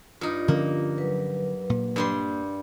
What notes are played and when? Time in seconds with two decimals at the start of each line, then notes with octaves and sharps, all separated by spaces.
0.21 G2 D#4 F4
0.48 D3 F3 A#3 C#4
0.98 F#3 B4
1.70 A#2
1.96 G2 G3 C6